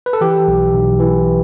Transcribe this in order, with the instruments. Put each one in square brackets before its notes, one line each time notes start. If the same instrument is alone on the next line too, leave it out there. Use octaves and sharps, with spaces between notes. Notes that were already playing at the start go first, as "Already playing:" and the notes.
[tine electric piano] B4
A4
E3 G4
B1
B1
E3